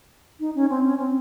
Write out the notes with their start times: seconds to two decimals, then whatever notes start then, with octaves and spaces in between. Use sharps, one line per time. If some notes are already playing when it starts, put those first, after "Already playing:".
0.40 D#4
0.55 C#4
0.70 C4
0.84 C#4
0.99 C4